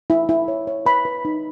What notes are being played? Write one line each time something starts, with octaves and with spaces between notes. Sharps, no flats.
E4
E4
C#5
C#5
B4 B5
B4
D#4